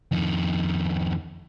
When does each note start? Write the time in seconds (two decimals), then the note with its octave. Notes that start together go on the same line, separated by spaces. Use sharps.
0.12 F2 D#3